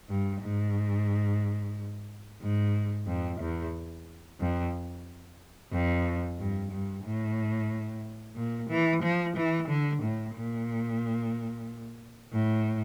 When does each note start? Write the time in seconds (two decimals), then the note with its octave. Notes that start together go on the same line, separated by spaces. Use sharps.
0.09 G2
0.42 G#2
2.41 G#2
3.07 F2
3.40 E2
4.40 F2
5.72 F2
6.38 G2
6.72 G2
7.04 A2
8.36 A#2
8.69 E3
9.02 F3
9.36 E3
9.68 D3
10.02 A2
10.35 A#2
12.33 A2